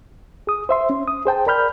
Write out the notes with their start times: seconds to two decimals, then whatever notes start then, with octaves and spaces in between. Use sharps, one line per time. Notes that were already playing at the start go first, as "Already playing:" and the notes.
0.47 G#4 D#6
0.69 C5 E5 C6
0.90 C#4
1.08 D#6
1.25 G#4 C5 G5 A5
1.47 A#4 D5 B5 F6 G6